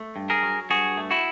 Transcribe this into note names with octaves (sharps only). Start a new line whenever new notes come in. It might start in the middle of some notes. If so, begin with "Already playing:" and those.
Already playing: A3
G2
G#4 A#4
F#3
G2 F#4 G#4
A3
E4 F#4